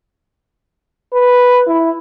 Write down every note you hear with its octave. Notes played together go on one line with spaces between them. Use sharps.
B4
E4